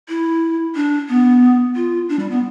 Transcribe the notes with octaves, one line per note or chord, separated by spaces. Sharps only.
E4
D4
B3
F4
D4
G3
B3